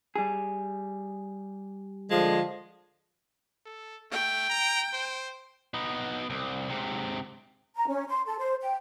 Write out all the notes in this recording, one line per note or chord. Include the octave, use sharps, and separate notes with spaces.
G3 G#4
D3 F3 G#3
A4
A3 G5
A#5
C5
B3 D#4
C2
G#2 C3
A#5
C#4
C6
A4
C5
G5